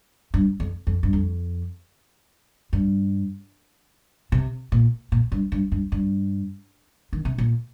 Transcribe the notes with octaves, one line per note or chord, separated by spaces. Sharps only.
G2
F2
F2
G2
F2
G2
C3
A#2
A#2
G2
G2
G2
G2
D#3
C3
A#2